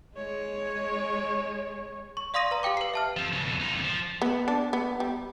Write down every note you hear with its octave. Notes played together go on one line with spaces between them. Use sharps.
G#3 C#5
C#6
D5 F5 C6 D#6 A#6 D#7
B4 A#5
G4 F5 G5 D6
B4 C7
E5 A5 F6
F3 C4
C#3 F#3
F2 B2
D#4 F4
F2 D3
F3
B3
D4
B3
G3